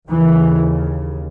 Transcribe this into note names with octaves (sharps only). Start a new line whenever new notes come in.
D#2 C#3 E3